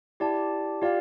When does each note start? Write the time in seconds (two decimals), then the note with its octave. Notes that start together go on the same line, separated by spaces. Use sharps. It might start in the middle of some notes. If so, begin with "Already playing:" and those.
0.20 E4 G4 D5 A5
0.82 F4 G4 D5 F5